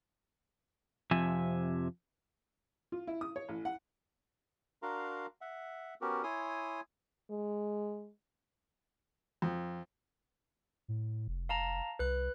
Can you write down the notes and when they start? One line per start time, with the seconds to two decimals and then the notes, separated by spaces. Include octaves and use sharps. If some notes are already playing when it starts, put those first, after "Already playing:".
1.11 F2 C3 F3 E5 G#5
2.92 F4
3.07 E4
3.21 D#6
3.36 C#5
3.49 A1
3.65 F#5
4.82 D4 F#4 A#4 F5 A#5 C6
5.41 E5 F#5
6.01 B3 C#4 F#4 G4 A#4
6.23 E4 C#5 G#5 C6 D#6
7.31 G#3
9.42 F2
10.88 A2
11.28 F1
11.49 F5 A5 A#5
11.99 C2 B4 F#6